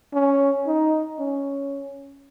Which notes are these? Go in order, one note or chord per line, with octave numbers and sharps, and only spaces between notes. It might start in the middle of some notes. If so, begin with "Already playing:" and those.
C#4
D#4
C#4